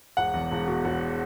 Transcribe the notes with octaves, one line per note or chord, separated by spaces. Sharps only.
E1 F#5
E2
E1
B2
E1